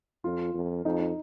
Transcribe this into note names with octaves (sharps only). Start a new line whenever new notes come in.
F2 F4
F2
F2 D#4
D#4